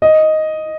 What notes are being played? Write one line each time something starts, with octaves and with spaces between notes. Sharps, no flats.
D#5